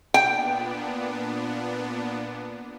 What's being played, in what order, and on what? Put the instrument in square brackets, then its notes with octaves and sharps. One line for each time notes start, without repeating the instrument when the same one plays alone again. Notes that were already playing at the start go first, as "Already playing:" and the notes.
[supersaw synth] A#2 B3 D4 [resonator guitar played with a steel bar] G5